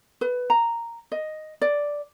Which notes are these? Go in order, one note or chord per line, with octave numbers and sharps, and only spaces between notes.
B4
A#5
D#5
D5